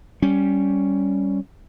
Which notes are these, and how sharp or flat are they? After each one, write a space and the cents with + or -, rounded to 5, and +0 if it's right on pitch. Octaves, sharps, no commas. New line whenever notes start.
G3 -5 C#4 +0